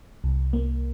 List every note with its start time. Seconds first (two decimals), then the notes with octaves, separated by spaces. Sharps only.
0.24 C2
0.53 A#3